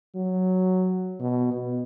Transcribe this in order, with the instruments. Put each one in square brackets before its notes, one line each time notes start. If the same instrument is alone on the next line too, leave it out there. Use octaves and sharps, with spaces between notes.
[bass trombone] F#3
B2
B2